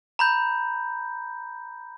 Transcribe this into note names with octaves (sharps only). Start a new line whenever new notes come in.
A#5 B5 G6